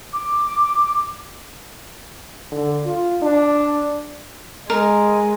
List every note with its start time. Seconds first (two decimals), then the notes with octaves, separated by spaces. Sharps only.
0.13 D6
2.52 D3
2.86 F4
3.22 D4
4.70 G#3 A#4